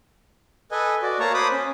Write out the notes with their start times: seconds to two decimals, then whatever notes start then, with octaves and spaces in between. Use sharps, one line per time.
0.71 A4 B4 D#5 G#5
1.02 F#4 D5
1.20 A#3 C#5 A5 A#5 C#6
1.34 C5 B5 D6 D#6 F#6
1.52 C#4